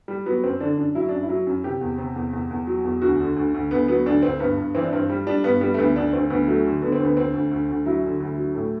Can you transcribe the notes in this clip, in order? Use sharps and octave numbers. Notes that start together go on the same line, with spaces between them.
G3
F#3 B3
F#2 C4
D3 D4
F#2 D4
F#3 E4
F#2 D4
E4
F#3
F#2
C3 G4
E2
C3
E2
E2
E2
F#3
E2
D2 F#4
D3
D2
D2
D2 B3
F#3 B3
D2 D4
D2 C4
G2 B3
G2
E3 C4
D4
G2 C4
G3
G3 D4
G2 B3
G3 B3
A3
D2 B3
D2 D4
D2 C4
D2 B3
F#3 A3
D3
D3 B3
C4
D2 B3
D2 C4
D2
D2
D2
F#3 E4
D3
D2
F#3
A2